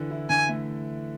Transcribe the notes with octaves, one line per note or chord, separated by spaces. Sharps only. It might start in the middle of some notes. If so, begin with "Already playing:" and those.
Already playing: D3 E3
E4
D3 G#5
A3